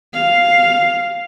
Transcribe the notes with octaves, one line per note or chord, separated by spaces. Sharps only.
F5